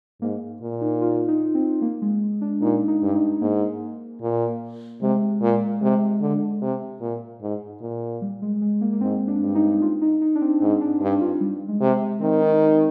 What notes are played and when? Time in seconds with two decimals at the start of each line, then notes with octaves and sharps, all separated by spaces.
0.22 G#2 A#3
0.62 A#2
0.81 D#4
1.01 F4
1.28 D#4
1.55 C4
1.81 A#3
2.02 G#3
2.41 D4
2.62 A#2 D#4
2.88 D#4
3.02 G2
3.15 D#4
3.41 G#2 A#3
4.22 A#2
5.02 C3 G#3
5.41 A#2
5.82 C3 G#3
6.21 D3
6.62 C3
7.01 A#2
7.42 G#2
7.82 A#2
8.22 G3
8.42 G#3
8.62 G#3
8.81 A#3
8.93 A#3
9.01 G#2 C4
9.27 D4
9.42 G2
9.55 D#4
9.82 F4
10.02 D#4
10.22 D#4
10.35 D4
10.41 C4
10.62 G#2 C4
10.81 D4
11.01 G2 D4
11.21 F4
11.41 G3
11.68 G#3
11.81 C3
12.21 D#3 C4
12.41 D#4
12.61 D#4